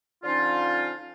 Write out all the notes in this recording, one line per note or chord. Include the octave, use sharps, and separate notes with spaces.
D3 F3 C#4 D#4 F4